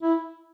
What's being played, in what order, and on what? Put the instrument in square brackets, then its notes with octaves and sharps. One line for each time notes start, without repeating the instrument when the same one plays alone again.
[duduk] E4